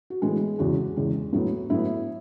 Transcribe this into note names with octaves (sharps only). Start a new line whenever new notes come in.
F#4
A2 E3 G#3 B3 G#4
E2 C#3 G#3 F#4
E2 C#3 G#3
A2 F#3 B3
A2 F#3 B3 E4